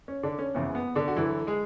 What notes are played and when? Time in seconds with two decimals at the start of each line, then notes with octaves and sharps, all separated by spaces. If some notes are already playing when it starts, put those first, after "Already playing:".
0.08 C#4
0.23 D3 D4
0.39 C#4
0.54 F#1 E2 C#3 E3 B3
0.75 B3
0.95 D3 D4
1.08 F#4
1.16 D2 D3 E3 F#3 E4
1.47 G#3 G#4